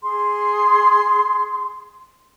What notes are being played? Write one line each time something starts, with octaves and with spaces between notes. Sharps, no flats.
G#4 C6